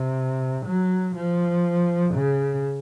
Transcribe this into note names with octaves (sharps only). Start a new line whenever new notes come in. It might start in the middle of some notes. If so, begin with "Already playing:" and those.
Already playing: C3
F#3
F3
C#3